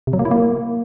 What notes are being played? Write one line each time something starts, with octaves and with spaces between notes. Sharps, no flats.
C3
F#3
A#3
E4
A#3